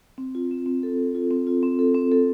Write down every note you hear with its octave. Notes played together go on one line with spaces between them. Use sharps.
C4
F4
C4
C4
A4
A4
F4
C4
F4
C4
A4
C4
A4